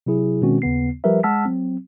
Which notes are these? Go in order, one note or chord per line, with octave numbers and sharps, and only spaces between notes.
C3 F#3 E4 G#4
B2 D#3 G#3 C4 C#4 F#4
D#2 C#3 B3 C7
F3 G3 G4 A#4 B4 E5
G#3 F#5 A5 E6 F6 B6
F#3 C4